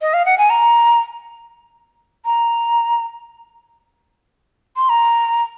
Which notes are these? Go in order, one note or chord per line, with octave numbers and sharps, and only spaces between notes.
D#5
F5
F#5
G#5
A#5
A#5
C6
A#5